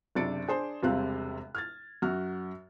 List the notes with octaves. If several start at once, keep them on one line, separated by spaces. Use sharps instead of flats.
F#1 C3 D4 A6 C#7 D7
D4 G#4 C5 C6
E1 C3 G3 C4 F5 F#6
F6 G#6 A6
F#2 F#4 F6